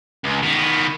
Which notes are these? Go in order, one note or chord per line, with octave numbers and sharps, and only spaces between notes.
C#2
D#3 B3